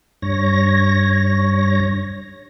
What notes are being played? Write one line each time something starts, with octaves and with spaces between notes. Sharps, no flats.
G2 C#5 A#6